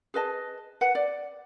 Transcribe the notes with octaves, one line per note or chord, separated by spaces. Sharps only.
G#4 B4 D#5 A5
B4 F#5
D5